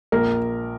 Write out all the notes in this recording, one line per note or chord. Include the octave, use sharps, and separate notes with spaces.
A#1 A#4